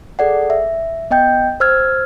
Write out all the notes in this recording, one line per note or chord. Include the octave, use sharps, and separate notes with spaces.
G#4 A4 D5 F#5
E5
B3 D#5 G5 G6
C5 E6 F6 G#6